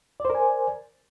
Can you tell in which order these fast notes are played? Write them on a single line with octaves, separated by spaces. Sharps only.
D5 C5 A#4 G#5